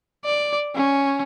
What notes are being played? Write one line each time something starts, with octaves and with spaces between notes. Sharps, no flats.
D5
C#4